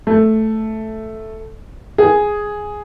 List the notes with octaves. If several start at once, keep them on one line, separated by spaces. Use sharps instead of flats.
A3
G#4